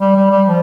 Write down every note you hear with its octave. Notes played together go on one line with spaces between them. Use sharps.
G3
G3
G3
F3